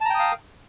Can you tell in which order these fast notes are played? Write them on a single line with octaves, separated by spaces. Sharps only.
A5 A#5 G5 D#6 F5